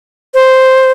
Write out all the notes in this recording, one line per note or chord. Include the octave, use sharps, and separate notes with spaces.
C5